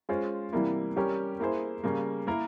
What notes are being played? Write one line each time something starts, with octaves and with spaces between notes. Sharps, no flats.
G#3 C#4 F4 C5
C3 E3 G3 A#3 E4
G3 C#4 G4 A#4
A#3 E4 G#4 C5
C#3 G3 A#3
A#3 E4 A#4